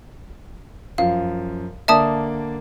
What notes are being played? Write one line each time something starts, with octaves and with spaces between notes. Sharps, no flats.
F#2 F3 F5
D3 A#3 D5 E5 A5 D#6